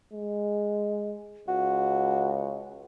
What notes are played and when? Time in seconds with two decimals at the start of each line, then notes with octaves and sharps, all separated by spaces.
0.13 G#3
1.48 C#2 F#4